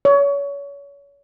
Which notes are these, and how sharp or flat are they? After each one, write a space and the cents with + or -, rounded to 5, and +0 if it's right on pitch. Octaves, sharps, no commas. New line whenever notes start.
C#5 +30